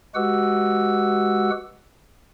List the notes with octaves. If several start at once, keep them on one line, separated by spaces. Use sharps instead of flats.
G#3 F#4 G4 B4 F#5 E6